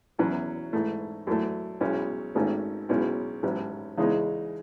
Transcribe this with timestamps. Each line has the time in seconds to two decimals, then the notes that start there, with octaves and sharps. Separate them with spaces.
0.19 E2 B2 F#3 C#4 E4
0.73 G#2 E3 A3
1.27 F#2 E3 A3
1.81 B1 B2 G#3 C#4 E4
2.35 G#1 G#2 D#3 A3 C#4
2.89 B1 B2 G#3 C#4 E4
3.43 A1 G#2 F#3 C#4
3.98 E2 C#3 E3 G#3 D#4